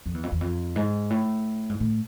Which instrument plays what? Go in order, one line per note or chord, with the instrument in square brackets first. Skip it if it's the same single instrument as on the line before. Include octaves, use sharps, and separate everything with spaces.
[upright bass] F2
E2
F2
E2
F2
G#2
A2
G#2
A2